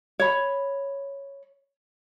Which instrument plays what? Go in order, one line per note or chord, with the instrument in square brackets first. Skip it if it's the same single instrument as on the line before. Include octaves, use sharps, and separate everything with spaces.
[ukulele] C#5 B5